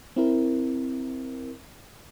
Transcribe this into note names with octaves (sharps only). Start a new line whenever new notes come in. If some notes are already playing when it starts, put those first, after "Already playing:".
C4 E4 A#4